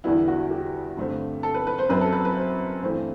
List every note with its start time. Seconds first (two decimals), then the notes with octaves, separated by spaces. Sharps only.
0.04 E2 D3 G3 B3 E4
0.28 F#4
0.51 G4
0.97 G2 D3 A3 C4
1.43 A4
1.54 B4
1.67 B4
1.78 C5
1.89 F#2 F#3 C4 B4
2.01 A4
2.13 B4
2.25 B4
2.36 C5
2.83 G2 E3 A3 C4